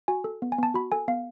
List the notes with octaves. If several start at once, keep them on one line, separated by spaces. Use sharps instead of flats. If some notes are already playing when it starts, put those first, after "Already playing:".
F#4 G#5
A4
B3
G#5
B3 A5
F#4 B5
A4 G#5
B3 F5